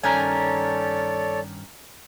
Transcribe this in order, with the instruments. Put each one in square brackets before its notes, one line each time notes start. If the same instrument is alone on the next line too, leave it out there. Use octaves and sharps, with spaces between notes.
[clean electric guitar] G2 D#3 C#4 [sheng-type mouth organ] A4 C#5 D5 [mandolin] A#4 G#5